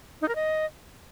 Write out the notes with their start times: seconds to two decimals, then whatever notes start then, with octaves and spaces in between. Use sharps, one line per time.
0.22 D#4
0.28 A#4
0.35 D#5